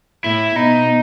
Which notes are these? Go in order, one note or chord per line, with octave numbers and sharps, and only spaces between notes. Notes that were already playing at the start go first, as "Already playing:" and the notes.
A2 E4
B2 D#4